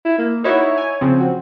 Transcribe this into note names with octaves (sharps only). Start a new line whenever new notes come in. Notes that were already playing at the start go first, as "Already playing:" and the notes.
E4
A#3
D#4 E4 F#4 C#5
G#5
C#3 F3 C4
F#4